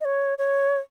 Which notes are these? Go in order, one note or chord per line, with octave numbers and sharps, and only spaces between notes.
D#5
C#5
C#5